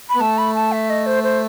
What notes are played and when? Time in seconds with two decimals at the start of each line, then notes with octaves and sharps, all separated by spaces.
0.09 B5
0.15 B3
0.20 A3 A5
0.38 B5
0.55 A5
0.72 E5
0.90 D#5
1.06 C5
1.24 C5